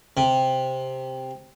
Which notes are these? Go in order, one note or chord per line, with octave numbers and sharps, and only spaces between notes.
C3